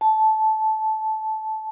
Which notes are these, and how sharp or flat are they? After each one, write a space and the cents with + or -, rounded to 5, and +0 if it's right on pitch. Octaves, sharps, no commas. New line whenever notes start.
A5 -15